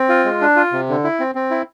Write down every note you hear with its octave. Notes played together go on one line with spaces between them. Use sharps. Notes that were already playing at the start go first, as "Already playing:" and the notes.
Already playing: C4
F4
G#3
D4
F4
C3
D3
E4
C4
C4
E4